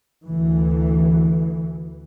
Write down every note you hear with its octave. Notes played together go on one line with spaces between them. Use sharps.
D2 E3